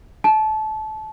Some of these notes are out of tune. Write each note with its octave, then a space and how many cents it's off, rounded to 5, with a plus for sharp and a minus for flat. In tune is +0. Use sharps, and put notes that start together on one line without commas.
A5 -25